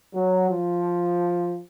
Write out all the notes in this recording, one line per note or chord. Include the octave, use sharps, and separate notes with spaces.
F#3
F3